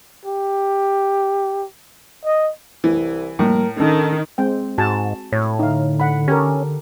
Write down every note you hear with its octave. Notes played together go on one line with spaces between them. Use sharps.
G4
D#5
C2 E3
A2 F3 G3 A#3 A#4
D#3 C#4 D4 A4
G#3 C4 G5
G#2 F#4 G#5 A5
A2 C#5
D3 D#4 F5
F#5 B5
C#4 G4 A4 A#4